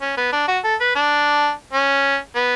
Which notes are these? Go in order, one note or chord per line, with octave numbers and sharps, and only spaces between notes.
C#4
B3
D4
F#4
A4
B4
D4
C#4
B3